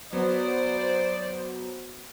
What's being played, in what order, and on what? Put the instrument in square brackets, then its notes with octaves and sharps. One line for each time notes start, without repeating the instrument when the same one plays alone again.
[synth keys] F#3 B3 [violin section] C5 [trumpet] D5